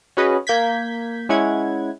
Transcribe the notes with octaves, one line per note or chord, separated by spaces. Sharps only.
C#4 F#4 G#4 B4 D#5
A#3 G6 G#6 B6
G#3 C#4 E4 F#5 G#6